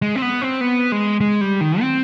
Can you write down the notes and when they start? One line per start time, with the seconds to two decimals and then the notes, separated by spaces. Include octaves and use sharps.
0.02 G#3
0.16 C4
0.22 B3
0.42 C4
0.61 B3
0.92 G#3
1.21 G#3
1.41 G3
1.61 D#3
1.81 C4